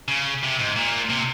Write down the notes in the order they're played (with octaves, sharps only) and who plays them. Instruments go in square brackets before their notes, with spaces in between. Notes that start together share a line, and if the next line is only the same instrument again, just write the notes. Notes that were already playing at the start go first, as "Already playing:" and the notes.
[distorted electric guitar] C#3
C3
G#2
A#2
C3